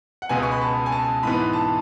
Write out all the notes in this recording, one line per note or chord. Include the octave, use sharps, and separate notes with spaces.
F#5
C#2 B2 G#3 B3 G#5
C#6
B5
A5
G#5
A5
G#2 E3 B3 B5
A5